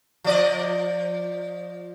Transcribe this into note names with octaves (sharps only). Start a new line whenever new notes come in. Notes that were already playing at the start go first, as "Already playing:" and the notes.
F3 D5 D#5